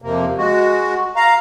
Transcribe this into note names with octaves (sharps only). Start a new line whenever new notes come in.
F2 C3 A#3
G#3 F#4
F5 A#5